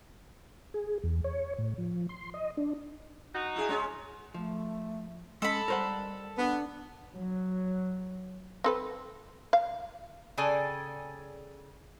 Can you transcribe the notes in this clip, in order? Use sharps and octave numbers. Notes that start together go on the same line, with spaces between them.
G#4
E2
C#5
A2
F3
C6
D#5
D4
D#4 F#4
E4 G#4
G#3 C#4
F3 A3
G#3 C#4 A4 B5
G3 A#4 C5 F#5
B3 D4
F#3
C4 A4 B4
F5
C#3 G#4 A4 D5 G5 G#5